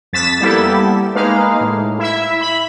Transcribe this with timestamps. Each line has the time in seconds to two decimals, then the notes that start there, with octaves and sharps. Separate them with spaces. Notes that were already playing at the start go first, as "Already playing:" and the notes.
0.13 F2 A6 B6 E7
0.40 G3 A#3 B3 E4 G4 A4
1.15 G#3 A#3 D#4 B4 F5
1.61 A2
1.99 E4 E5
2.41 B5